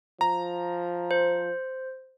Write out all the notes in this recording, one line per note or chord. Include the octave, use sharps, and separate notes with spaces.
F3 A#5
C5